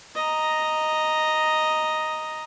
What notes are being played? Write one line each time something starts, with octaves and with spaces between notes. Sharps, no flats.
D#5 A#5